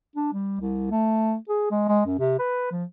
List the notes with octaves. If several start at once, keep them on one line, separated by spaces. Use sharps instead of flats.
D4
G3
C2
A3
G#4
G#3
G#3
F#2
C3
B4
F3